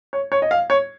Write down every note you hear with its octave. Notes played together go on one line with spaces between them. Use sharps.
C#5
C#5
D#5
F5
C#5